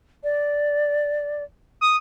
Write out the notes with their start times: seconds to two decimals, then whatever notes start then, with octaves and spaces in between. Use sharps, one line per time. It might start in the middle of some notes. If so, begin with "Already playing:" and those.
0.24 D5
1.81 D#6